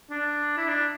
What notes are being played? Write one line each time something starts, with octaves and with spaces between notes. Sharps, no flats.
D4
E4
D4